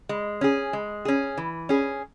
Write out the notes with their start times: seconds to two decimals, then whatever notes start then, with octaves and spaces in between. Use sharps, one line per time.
0.09 G#3
0.41 C#4 G#4
0.73 G#3
1.05 C#4 G#4
1.37 E3
1.69 C#4 G#4